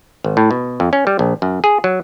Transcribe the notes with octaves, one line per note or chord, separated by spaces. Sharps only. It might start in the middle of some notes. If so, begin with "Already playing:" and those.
G#1
A2
B2
F2
C#4
G3
A#1
F#2
G#4
F#3